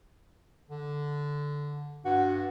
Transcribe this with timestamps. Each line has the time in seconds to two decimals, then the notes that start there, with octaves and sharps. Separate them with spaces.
0.69 D3
2.05 G2 F#4